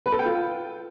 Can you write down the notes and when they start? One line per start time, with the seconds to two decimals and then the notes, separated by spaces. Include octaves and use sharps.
0.06 B4
0.12 A4
0.19 G5
0.26 F4